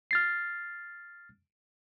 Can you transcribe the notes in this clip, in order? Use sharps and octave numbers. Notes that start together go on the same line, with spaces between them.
F6 A6 C7